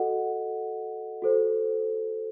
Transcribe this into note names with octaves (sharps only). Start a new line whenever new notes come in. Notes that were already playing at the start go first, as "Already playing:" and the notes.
Already playing: F#4 A4 D#5 F#5
F#4 A4 C5